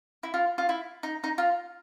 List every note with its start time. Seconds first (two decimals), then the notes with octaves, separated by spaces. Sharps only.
0.23 E4
0.34 F4
0.58 F4
0.69 E4
1.03 D#4
1.24 D#4
1.38 F4